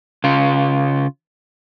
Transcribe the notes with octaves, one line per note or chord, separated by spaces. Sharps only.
C#3 F4